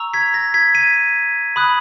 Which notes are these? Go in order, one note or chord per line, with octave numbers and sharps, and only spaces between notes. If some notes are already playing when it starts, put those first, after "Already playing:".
Already playing: A#5 C#6 E6
G#6 B6
A#6
G#6 B6
B6 D#7
B5 D#6 F#6